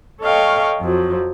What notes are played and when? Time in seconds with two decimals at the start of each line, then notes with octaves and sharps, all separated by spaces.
0.22 A4 C#5 D#5 F5 G5 C#6
0.80 F2 F3 F#3